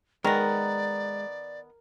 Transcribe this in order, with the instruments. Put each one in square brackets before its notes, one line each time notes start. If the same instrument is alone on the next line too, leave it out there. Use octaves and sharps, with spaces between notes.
[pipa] D#3 B3 [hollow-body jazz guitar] G#3 [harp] A#4 [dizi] D5